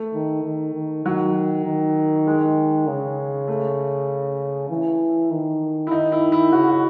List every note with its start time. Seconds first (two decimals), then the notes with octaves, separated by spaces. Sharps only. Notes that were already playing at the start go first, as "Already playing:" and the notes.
Already playing: A3
0.14 D#3
0.44 D#3
0.74 D#3
1.05 D#3 F#3
1.65 D#3
2.27 G#3
2.87 C#3
3.48 A3
4.70 E3
5.31 D#3
5.87 E4
5.91 D#3 D#4
6.12 E4
6.32 E4
6.52 C#3 F#4
6.68 F#4